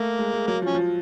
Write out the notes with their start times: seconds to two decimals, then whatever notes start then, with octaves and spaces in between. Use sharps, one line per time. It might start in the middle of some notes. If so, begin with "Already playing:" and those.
Already playing: A3 A#3
0.19 G#3
0.34 G#3
0.47 F#3 A#3
0.62 F3
0.66 C#4
0.75 F3